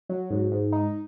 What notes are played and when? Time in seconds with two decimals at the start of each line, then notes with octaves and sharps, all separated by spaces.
0.09 F#3
0.30 G#2
0.51 G#2
0.72 D#4